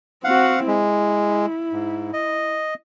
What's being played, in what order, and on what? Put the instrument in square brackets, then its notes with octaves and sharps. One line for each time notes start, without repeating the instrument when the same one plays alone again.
[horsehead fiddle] C4 F#4 [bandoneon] F5 F#5
[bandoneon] G#3 [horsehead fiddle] E4
[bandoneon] G#2
D#5